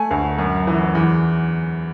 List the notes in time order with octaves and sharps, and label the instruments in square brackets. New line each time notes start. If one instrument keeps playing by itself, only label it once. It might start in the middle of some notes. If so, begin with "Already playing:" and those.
Already playing: [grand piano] A3 G#5
D2
F#2
E3
E2